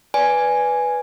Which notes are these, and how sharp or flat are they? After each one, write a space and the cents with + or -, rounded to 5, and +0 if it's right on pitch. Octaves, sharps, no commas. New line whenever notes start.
B4 +0 D5 -15 G#5 +0